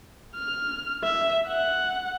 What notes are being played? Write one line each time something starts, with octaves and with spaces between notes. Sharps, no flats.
F6
E5
F#5